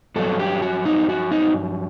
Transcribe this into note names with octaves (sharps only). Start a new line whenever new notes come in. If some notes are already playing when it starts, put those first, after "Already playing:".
G2 F#3 A4
G4
F#4
D#4
F#4
D#4